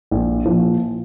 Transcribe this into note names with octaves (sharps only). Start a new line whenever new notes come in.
A#1
A#2 F3